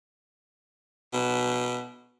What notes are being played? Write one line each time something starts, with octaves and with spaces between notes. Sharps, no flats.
B2